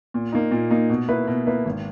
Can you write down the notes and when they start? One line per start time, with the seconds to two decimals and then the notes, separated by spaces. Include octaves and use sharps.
0.14 A#2
0.32 A#3 D#4
0.51 A#2
0.71 A#3 D#4
0.89 B2
1.09 A#3 E4 B4
1.27 B2
1.47 A#3 E4 B4
1.65 G#1